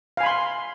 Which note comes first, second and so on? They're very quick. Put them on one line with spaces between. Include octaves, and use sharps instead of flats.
F5 G#5 B5 C6